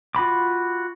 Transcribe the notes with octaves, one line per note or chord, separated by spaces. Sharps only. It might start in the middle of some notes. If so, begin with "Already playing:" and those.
F4 F#4 B5 D6